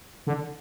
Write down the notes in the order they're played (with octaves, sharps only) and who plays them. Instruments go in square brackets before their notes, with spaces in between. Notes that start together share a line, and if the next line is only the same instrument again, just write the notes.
[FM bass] D3